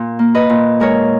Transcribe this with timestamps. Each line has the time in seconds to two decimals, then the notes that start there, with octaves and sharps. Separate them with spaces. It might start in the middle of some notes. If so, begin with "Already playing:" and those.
Already playing: A#2
0.19 A#3
0.35 B4 D#5
0.50 A#2
0.80 G#3 A#4 C#5